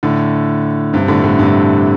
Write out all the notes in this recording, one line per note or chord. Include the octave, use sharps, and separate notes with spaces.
A2 D3
G2 C3
A2 D3
A2 D3
G2 C3